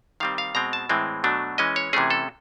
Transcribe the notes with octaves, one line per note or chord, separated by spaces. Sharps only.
D#3 G3 C4 F5
F5
B2 G#3 C4 A#5
A5
A2 E3 G#3 C4
B2 F#3 A3 D4
E3 G#3 C#4 D#5
C#5
C3 E3 A3 C#4 G#4
A4